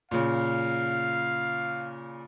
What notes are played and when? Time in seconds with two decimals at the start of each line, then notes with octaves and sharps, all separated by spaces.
0.11 A#2 C#3 F5